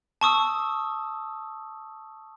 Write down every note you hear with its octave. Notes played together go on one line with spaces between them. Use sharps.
A5 C#6 D#6 E6